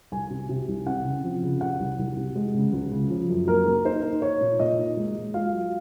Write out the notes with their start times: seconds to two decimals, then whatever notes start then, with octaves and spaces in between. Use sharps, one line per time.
0.12 C2 G#5
0.30 C3
0.49 C3
0.68 C2
0.86 C4 F#5
1.05 C#3
1.24 F3
1.43 C#3
1.61 C3 F#5
1.79 C2
1.98 C2
2.17 C3
2.36 G#3
2.54 C#3
2.73 C#2
2.91 C#3
3.10 F3
3.29 F#2
3.47 A#3 A#4
3.66 A#3
3.85 D#4 C5
4.03 D#4
4.22 D#4 C#5
4.41 A#2
4.60 A#2 D#5
4.78 D#4
4.97 G#3
5.15 G#3
5.34 F4 F5
5.53 F#3